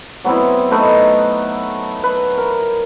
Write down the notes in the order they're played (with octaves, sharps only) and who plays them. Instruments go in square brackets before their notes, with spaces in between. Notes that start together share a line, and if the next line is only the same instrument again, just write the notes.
[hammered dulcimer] F#3 B3 C4 E4
A3 D#4 B4 D#5
B4
A#4